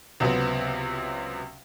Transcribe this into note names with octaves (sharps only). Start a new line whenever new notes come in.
C#2 C3 F#3 B3 C4